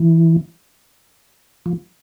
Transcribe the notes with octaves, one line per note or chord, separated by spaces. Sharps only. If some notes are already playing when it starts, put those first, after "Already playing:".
Already playing: E3
F3